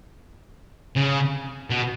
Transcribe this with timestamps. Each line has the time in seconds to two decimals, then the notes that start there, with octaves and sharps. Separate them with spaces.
0.96 C#3
1.70 B2